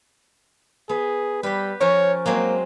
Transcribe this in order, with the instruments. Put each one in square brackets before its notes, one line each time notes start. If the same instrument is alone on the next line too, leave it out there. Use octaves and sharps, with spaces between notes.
[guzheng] B3 [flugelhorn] G#4
[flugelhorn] G3 [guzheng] G4 B4
[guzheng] F3 C#4 A#4 [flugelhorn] C#5
[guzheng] F#3 G#3 C4 [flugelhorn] A#3